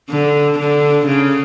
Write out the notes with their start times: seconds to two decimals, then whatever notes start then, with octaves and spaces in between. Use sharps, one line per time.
0.10 D3
0.59 D3
1.06 C#3